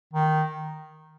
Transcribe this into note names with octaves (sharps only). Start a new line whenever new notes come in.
D#3